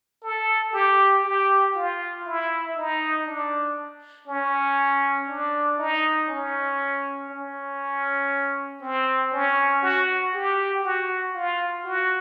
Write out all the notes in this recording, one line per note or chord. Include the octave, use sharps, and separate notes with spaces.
A4
G4
G4
F4
E4
D#4
D4
C#4
D4
D#4
C#4
C#4
C4
C#4
F#4
G4
F#4
F4
F#4